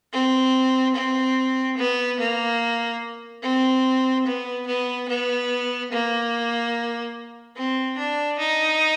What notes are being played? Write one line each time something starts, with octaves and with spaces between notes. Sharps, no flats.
C4
C4
B3
A#3
C4
B3
B3
B3
A#3
C4
D4
D#4